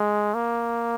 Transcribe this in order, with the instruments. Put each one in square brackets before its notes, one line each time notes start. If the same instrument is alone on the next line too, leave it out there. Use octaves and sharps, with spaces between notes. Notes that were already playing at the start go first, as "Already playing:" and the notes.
Already playing: [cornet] G#3
A#3